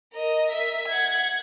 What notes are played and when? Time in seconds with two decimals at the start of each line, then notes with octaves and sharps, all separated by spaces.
0.13 A#4 D#5
0.51 E5
0.88 F#5 G#6